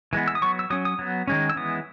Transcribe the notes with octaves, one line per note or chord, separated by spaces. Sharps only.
E3 G#3 B3
E6
D#6
F#3 B3 C#6
E6
F#3 C#4 D#6
D#6
F#3 B3
D#3 G#3 C#4
E6
E3 G#3 B3 D#6